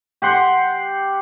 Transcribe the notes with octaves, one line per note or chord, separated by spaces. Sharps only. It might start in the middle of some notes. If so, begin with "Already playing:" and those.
G4 F#5 C6